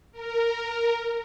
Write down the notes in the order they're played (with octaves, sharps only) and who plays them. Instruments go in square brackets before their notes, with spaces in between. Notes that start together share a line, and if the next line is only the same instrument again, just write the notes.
[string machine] A#4